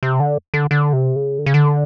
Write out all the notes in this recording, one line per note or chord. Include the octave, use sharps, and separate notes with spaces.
C3
D3
D3
D3
C3
C#3
D3
C#3
D3